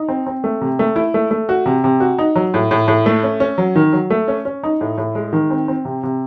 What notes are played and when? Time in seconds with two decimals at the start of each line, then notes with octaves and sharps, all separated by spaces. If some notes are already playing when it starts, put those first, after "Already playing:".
Already playing: D#4
0.08 C4
0.27 C4
0.44 A3
0.61 C3
0.79 A3
0.96 E4
1.14 A3
1.31 A3
1.49 F#4
1.66 C3
1.84 C3
2.00 F#4
2.18 D#4
2.35 F#3
2.54 A2
2.71 A2
2.88 A2
3.06 A3
3.23 C#4
3.40 C#4
3.58 F#3
3.76 D#3
3.93 F#3
4.10 A3
4.28 C#4
4.45 C#4
4.64 D#4
4.81 A2
4.97 A2
5.15 G#3
5.33 D#3
5.50 C4
5.68 C4
5.85 C3
6.03 C3